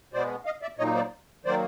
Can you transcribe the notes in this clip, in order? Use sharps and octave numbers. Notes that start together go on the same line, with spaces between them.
B2 G#3 B3 C5 D5
D#5 F5
D5 E5
A#2 F#3 A#3 D#4 C#5 D#5
C5 D5
D#3 F#3 A#3 C5 D5